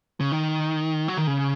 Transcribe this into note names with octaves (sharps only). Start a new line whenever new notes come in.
C#3
D#3
F#3
D#3
C#3